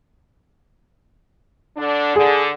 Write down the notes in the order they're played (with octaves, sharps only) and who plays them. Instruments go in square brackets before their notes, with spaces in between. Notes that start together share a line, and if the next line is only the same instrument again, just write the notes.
[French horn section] D3 D4
[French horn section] D3 [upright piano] G#4